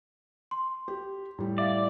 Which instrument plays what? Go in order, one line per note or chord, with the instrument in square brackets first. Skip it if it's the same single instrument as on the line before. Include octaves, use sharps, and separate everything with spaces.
[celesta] C6
[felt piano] G4
A2 G3
[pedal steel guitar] D5 [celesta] E5 F5